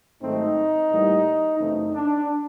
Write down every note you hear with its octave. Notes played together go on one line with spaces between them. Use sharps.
G#2 D#3 F#3 A3 C4 D#4
A2 E3 G3 A#3
F#2 C#3 E3 A3 C4 D#4
D4